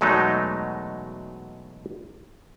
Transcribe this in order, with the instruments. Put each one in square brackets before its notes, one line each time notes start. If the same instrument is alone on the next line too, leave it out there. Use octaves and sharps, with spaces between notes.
[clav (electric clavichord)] E2 B2 F#3 G#3 A3 D#4